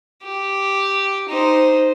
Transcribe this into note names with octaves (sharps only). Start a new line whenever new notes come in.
G4
D#4 C5